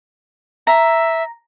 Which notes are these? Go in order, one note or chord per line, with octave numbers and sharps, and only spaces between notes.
E5 A#5